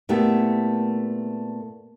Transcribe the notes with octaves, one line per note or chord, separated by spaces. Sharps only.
A#2 A3 B3 E4 G4 A4